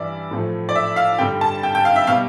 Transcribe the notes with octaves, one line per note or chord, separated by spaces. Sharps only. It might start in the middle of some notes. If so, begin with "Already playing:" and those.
Already playing: G2 E3 G3 D5 E5
A2 F3 A3
D5
E5
F5
G2 D3 G3 G5
A5
G5
G5
F5
E5
B2 G3 F5